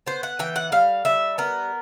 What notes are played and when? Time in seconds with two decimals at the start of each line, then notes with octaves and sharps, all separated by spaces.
0.07 B3 C5
0.23 F#5
0.39 E3 G5
0.56 F#5
0.72 G3 F5
1.05 G3 E5
1.38 B3 A#4